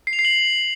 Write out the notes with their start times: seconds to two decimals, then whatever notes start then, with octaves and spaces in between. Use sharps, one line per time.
0.07 C7
0.13 F7
0.19 C7
0.25 F#7